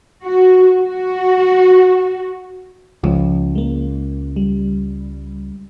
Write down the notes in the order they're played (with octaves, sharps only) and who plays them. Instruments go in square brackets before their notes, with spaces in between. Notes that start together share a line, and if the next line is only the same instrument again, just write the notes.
[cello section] F#4
F#4
[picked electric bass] C#2 [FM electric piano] F3
[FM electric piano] G#3 A#3
G3